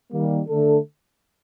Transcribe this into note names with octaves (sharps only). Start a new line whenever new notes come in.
D#3 G3 A#3
D3 A3 D4 A4